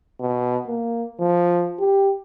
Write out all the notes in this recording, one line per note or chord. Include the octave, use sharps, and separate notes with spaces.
B2
A#3
F3
G4